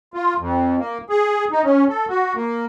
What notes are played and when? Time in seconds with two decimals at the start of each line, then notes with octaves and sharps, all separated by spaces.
0.14 F4
0.38 F2
0.79 A#3
1.10 G#4
1.52 D#4
1.65 C#4
1.89 A4
2.09 F#4
2.35 A#3